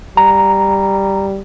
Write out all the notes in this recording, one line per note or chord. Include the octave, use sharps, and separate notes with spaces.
G3 A#5